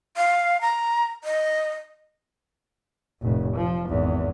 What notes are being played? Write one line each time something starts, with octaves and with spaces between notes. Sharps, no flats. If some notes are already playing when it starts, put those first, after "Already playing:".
F5
A#5
D#5
F1 A2
F3
G#1 E2